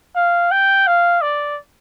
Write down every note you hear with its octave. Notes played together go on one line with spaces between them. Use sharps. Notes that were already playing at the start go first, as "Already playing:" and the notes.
F5
G5
F5
D5